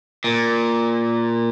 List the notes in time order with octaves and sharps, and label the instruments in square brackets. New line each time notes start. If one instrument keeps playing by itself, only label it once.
[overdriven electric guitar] A#2